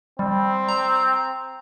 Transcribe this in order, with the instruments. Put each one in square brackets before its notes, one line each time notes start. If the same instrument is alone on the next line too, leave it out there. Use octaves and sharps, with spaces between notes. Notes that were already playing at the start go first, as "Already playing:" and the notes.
[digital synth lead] G3 [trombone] C4
[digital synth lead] A#5